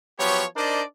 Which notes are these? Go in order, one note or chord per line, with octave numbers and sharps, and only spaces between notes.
F3 F#3 B3 G4 C#5
D4 D#4 A#4 C5 D5 D#5